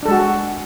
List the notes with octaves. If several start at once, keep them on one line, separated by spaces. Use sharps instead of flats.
G#3 D4 F#4 A4